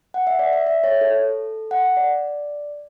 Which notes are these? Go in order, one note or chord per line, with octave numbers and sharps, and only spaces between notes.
F#5
E5
D5
E5
E5
C#5
A4
F#5
D5